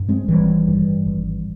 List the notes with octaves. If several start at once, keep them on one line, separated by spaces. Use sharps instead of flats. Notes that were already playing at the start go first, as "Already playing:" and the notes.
Already playing: G2
G#3 C4
G#1 E3 G3
G2
G#1